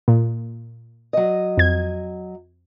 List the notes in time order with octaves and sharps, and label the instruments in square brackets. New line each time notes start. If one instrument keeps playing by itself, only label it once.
[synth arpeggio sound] A#2
[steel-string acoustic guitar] F#3 D#5
[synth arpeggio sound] F2 G#6